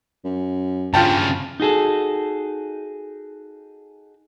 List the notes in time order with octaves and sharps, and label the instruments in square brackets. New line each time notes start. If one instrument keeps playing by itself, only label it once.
[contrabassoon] F#2
[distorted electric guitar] G2 C#3 [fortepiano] F4 G5 A5
[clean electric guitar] D#4 F#4 G#4 A4